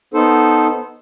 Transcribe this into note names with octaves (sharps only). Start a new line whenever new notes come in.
B3 D#4 A4 C5